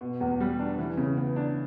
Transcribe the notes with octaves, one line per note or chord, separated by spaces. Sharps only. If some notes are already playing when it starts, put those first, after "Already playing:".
B2
E2
G3
D4
E3
C#3
B3
D4